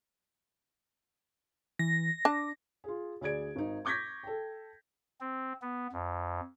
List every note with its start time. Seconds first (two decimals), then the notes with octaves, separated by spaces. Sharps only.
1.79 E3 A#6
2.25 D4 A5 D6
2.84 F4 G#4
3.21 D2 G#4 D5 G#6 D7
3.56 G#1 D#4
3.85 C#6 D6 G6 G#6 A#6 B6
4.23 A4 G5
5.21 C4
5.62 B3
5.93 F2